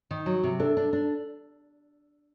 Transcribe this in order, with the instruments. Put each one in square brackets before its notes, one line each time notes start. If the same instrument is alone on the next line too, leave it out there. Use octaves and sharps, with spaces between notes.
[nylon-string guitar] D#3
F#3
C3
[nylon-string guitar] D4 [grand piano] A4
[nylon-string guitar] D4
D4